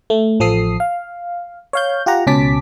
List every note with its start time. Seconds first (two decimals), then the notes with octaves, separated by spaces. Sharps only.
0.10 A3
0.40 A1 F3 A4 D#6 C7
0.80 F5
1.73 C#5 F5 G6
2.06 F4 G4 F#5 A#5
2.27 C#2 B2 C#4 A5 D6 B6